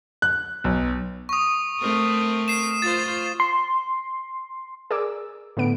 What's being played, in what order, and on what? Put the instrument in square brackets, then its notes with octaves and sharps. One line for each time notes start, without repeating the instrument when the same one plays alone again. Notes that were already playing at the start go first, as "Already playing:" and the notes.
[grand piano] F#6
B1
[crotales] C#6 D#6
[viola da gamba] A3 C4 A#4
[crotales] C7 E7
[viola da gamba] F4 C5 [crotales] A6
[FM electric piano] C6
[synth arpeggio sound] G#4 A#4 D5 D6 E6
A2 D3 B3 D7